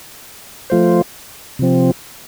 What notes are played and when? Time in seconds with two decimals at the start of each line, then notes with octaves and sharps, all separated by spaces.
0.70 F3 A3 F4 C5
1.59 C3 F3 C4